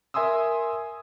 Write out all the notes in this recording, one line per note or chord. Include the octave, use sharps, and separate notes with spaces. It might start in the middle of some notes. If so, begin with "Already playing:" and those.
A#4 E5 G#5 C6 D#6 E6